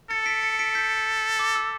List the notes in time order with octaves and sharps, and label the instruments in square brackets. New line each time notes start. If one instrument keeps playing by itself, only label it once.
[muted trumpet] A4 [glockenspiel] A6 C#7
[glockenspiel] B6 D7
A6 C#7
B6 D7
G6 B6
D6
E6